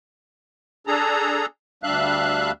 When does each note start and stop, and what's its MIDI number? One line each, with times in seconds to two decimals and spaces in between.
0.87 1.46 62
0.87 1.46 68
0.87 1.46 69
0.87 1.46 82
1.83 2.51 38
1.83 2.51 55
1.83 2.51 62
1.83 2.51 76
1.83 2.51 77
1.83 2.51 90